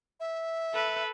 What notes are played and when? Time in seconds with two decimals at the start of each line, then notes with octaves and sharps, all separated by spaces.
0.20 E5
0.74 A4 B4